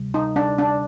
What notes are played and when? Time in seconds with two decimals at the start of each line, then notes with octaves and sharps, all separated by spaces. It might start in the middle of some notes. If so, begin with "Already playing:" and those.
Already playing: D2 C3 G3
0.14 D#4
0.36 D4
0.58 D4